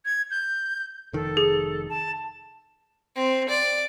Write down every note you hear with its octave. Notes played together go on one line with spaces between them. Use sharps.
G#6
G6
F1 D#3 A4
G#4
A5
C4
D5